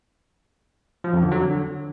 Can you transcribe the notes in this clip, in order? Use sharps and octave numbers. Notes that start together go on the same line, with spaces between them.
F3
F2
D3
F#3
D3